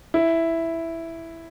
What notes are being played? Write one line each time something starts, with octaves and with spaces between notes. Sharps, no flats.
E4